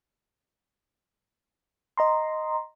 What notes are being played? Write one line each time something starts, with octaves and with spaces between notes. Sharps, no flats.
D#5 A#5 C6